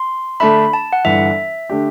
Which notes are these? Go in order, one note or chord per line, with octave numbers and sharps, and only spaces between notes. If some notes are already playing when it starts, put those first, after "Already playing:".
Already playing: C6
D3 A3 D4 A4 E5 B5
A5
F#5
G1 G2 E3 E5
D3 A3 D4 G4